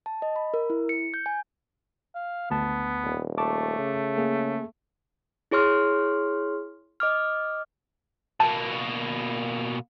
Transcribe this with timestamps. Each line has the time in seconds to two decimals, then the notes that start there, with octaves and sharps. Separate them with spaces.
0.06 A5
0.22 D#5
0.36 B5
0.54 A#4
0.70 E4
0.89 C#7
1.14 G6
1.26 G#5
2.15 F5
2.50 G#1 D2 B3 A5
3.04 D#1
3.38 A3 A5 C#6 D6
3.79 C#3
4.18 A#3 G#4
5.51 E4 G#4 C#5 C6 F6
7.00 D#5 D6 F6
8.40 B2 A#3 A5